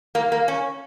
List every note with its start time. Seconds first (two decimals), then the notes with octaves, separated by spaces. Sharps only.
0.15 A#3
0.32 A#3
0.48 C#4